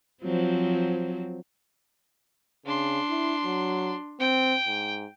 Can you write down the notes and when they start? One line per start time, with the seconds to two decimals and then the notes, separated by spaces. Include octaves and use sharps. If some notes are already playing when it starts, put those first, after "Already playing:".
0.23 F3 F#3 C4
2.66 C#3 D4 C6
3.09 E4
3.44 F#3
4.20 C4 G5
4.67 G#2